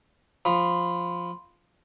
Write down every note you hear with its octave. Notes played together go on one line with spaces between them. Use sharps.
F3 B5 C6